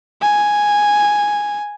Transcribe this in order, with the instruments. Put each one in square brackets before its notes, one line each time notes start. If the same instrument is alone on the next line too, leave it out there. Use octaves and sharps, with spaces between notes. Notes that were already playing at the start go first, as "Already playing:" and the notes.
[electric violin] G#5